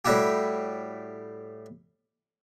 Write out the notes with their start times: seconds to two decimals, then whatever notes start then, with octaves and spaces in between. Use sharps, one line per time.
0.05 A2 G3 E4 F#4 G4